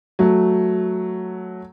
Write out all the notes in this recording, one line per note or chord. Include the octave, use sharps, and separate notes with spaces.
F#3 A3